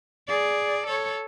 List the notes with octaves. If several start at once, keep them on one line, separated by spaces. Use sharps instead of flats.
G#4 D5
A4 C#5